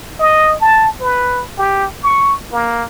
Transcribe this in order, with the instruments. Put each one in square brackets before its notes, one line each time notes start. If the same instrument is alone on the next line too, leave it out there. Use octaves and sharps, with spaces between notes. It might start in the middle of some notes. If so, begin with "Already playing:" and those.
[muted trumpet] D#5
A5
B4
G4
C#6
A#3